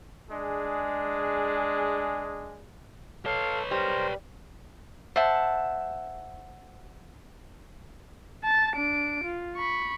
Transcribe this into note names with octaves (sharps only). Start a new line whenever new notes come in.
G#3 D4 G#4
A4 B4 C#5 F5
G3 A#4 C5
C5 E5 F#5 A5
A5 A6
D4 D7
F4
B5 C#6